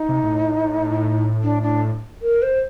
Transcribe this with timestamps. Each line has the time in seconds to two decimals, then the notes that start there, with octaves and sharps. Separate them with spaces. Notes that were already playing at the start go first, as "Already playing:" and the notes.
Already playing: D#4
0.09 C3
0.24 A2
1.43 D4
1.63 D4
2.22 A#4
2.42 C5